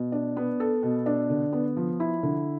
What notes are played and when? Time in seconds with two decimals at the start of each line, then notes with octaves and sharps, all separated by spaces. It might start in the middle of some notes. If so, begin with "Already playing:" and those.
Already playing: B2
0.12 D4
0.37 B3
0.60 A4
0.83 B2
1.06 D4
1.30 D3
1.53 B3
1.76 F3
2.00 E4
2.23 D3